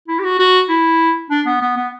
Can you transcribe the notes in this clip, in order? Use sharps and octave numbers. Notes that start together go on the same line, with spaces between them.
E4
G4
F#4
F#4
E4
D4
B3
B3
B3